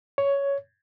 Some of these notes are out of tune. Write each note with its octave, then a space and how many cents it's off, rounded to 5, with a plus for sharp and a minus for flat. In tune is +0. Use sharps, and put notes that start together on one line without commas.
C#5 +10